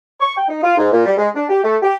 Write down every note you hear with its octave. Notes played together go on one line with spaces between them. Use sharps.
C#6
G5
D#4
F4
G#2
A#2
G3
G#3
D4
G4
A3
G4